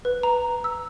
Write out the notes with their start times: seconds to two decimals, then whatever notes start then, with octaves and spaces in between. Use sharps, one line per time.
0.05 B4
0.23 A#5
0.64 E6